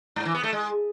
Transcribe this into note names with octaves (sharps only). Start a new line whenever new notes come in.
G#2
E3
B3
A3
G#3